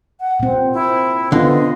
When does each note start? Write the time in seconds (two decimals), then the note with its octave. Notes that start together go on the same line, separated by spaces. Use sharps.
0.20 F#5
0.40 A#2 C4
0.74 E4
1.32 D3 B3 F4 D#5